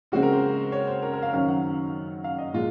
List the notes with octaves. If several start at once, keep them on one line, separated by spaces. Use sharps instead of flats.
C#3 G#3 C4 F#4
A#4
C5
C#5
C5
A#4
A#4
F5
F#2 D#3 F#3 C#4 F5
F#5
F5
D#5
A#2 G#3 F4